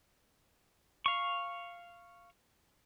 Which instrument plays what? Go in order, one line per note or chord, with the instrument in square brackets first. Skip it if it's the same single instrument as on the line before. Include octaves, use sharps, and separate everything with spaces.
[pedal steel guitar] F5 C#6